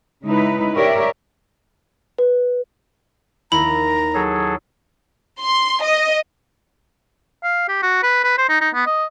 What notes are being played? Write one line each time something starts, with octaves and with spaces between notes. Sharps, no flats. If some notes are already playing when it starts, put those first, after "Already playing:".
C#3 G#3 D#4 E4 B4
G4 A#4 C#5 D5 E5
B4
D#2 E4 A#5 B5
F#3 G#4 A4
C6
D#5
F5
G4
F#4
B4
B4
C5
D#4
D#4
B3
D#5